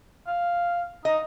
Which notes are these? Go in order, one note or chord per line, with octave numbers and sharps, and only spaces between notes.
F5
D#4 D#5